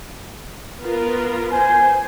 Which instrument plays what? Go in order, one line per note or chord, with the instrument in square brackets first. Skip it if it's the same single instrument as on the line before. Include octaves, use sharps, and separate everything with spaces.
[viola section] B3 F4 A#4
[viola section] C5 [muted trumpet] G#5